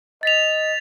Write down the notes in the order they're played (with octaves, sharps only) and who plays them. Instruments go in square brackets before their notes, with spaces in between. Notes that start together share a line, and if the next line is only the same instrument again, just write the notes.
[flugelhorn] D#5 [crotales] A6 B6 F7